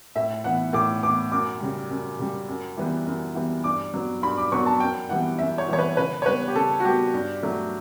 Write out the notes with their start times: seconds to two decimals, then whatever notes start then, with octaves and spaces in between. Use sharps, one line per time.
0.16 A2 E5
0.44 E3 B3 F#5
0.73 A2 D6
1.03 E3 B3 D6
1.32 F#2 D6
1.60 C#3 G3
1.90 F#2
2.19 C#3 G3
2.49 F#2
2.77 E3 G3 B3
3.06 F#2
3.35 E3 G3 B3
3.64 G2 D6
3.94 F#3 B3
4.22 G2 B5
4.38 D6
4.52 F#3 B3 C#6
4.66 A5
4.80 F#2 G5
5.09 E3 G3 B3 F#5
5.38 F#2 E5
5.58 C#5
5.68 E3 G3 B3 C#5
5.78 B4
5.97 C#3 B4
6.22 C#5
6.26 G3 B3 B4
6.48 G4
6.55 C#3 A4
6.80 F#4
6.84 G3 B3 G4
7.14 G2
7.43 F#3 A3